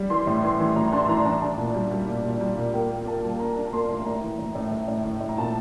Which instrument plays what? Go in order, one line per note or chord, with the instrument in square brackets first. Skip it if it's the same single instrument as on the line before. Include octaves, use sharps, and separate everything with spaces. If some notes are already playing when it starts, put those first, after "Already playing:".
Already playing: [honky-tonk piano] G3
E3 C6
A2
E3 C6
E3
A2 A#5
D4 C6
C6
E3 A#5
D4 A#5
D4
A#2
G3
G3
A#2
A#2
G3
A#2
A#3 G5
A#3
A#3 A5
G3
D4 A#5
D4
A#5
A#3 C6
A2
A2 A#5
E3
A2
A2
A2
A2
A2
A2
A#5
A#2 A5